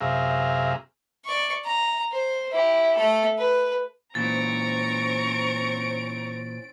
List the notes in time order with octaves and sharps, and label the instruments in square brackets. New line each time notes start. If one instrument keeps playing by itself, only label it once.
[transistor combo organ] F#2 C3 G#4 E5 F5 A#5
[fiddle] D5 C#6
A#5
C5
E4 G4
A3 A4
B4
[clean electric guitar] A#2 E3 [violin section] C4 C#4 D7 [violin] A#5 C#6 [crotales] A6